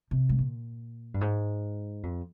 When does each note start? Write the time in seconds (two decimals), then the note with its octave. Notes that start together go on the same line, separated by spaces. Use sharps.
0.11 C3
0.29 G#2
0.39 A#2
1.14 G2
1.21 G#2
2.03 F2